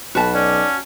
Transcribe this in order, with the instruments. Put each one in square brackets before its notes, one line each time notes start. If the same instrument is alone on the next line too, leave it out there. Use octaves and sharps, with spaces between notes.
[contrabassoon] B1 [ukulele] F#4 A5 [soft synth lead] B5
[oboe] C#4 [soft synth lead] D5